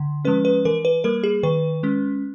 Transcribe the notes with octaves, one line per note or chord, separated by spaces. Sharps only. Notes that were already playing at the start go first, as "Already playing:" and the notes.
Already playing: D3
F3 G#3 C#4 B4
B4
E3 A#4
B4
G3 A#3 A#4
G#4
D#3 B4
G#3 C#4